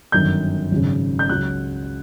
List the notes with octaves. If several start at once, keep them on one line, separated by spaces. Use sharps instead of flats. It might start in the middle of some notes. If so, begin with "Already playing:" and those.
G1 F#2 D#3 G6
G#1 F#2 C#3
G6
C#2 C#3 F#3 F#6